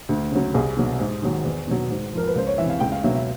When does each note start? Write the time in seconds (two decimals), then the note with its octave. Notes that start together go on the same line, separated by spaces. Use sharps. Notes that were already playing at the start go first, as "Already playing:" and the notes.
0.09 D2
0.32 C#3 F#3
0.54 C2 G#4
0.77 B2 F#3
1.00 G#2
1.22 D#3 F#3
1.45 E2
1.67 B2 F#3
1.90 G#2
2.13 F3 A#4
2.27 B4
2.35 C#2 C5
2.47 C#5
2.58 C3 E3 E5
2.70 F5
2.80 C#2 G5
2.92 F5
3.03 B2 F#3 E5
3.15 E5